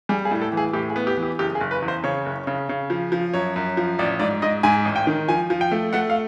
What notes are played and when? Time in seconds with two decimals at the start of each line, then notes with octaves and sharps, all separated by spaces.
0.09 G3 G#4
0.25 G#4
0.31 A2
0.42 A4
0.52 E3
0.57 G#4
0.73 A2 G4
0.90 G#4
0.96 B3
1.07 G4
1.17 E3
1.23 G4
1.39 F#1 G4
1.55 G#4
1.60 F#1
1.71 B4
1.82 E2
1.88 C5
2.04 C#3 C#5
2.26 F#1
2.47 C#3
2.69 C#3
2.90 F3
3.12 F3
3.34 F#2 C#5
3.56 F#2
3.77 F3
3.99 A1 D5
4.20 G#2 D5
4.42 G#2 D#5
4.63 G#2 G#5
4.85 A1
4.96 G5
5.07 D#3
5.28 F3 G#5
5.50 F3
5.61 G5
5.72 A3
5.93 A3 F#5
6.10 F5